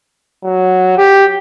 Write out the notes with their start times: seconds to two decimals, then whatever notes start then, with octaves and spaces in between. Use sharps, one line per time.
0.44 F#3
0.97 G4